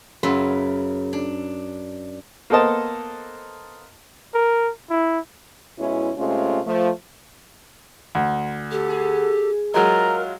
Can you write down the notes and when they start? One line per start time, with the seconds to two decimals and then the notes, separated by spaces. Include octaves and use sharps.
0.23 F#2 C#3 B4 E5 C6
1.13 D4
2.50 A#3 B3 A4 C5 D#5 A5
4.34 A#4
4.90 E4
5.79 B2 G#3 C#4 E4
6.17 C3 G#3 A3 C#4 F4
6.66 F3 A3
8.15 D2
8.71 G4 A4
8.89 G#4
9.74 F#3 G#3 E4 F4 A#4 A#5